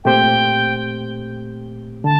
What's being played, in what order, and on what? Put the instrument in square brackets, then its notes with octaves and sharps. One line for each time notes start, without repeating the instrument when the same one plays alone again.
[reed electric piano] A#2 A3 C4 G4 C5 [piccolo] G5
[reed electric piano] D3 [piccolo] A5